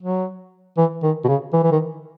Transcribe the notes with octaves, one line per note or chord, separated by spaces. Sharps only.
F#3
E3
D#3
B2
C#3
E3
E3
D#3